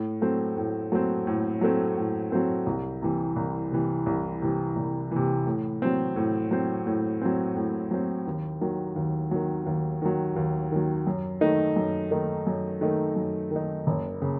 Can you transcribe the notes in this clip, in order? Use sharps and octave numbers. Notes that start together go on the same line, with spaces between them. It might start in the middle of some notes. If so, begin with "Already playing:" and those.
Already playing: A2
F#3 A3 C4
A2
F#3 A3 C4
A2
F#3 A3 C4
A2
F#3 A3 C4
C2
C3 E3
C2
C3 E3
C2
C3 E3
C2
C3 E3
A2
F#3 C4
A2
F#3 C4
A2
F#3 C4
A2
F#3 C4
D#2
D#3 F#3
D#2
D#3 F#3
D#2
D#3 F#3
D#2
D#3 F#3
F#2
D#3 A3 D#4
F#2
D#3 A3 D#4
F#2
D#3 A3 D#4
F#2
D#3 A3 D#4
F#1
C#3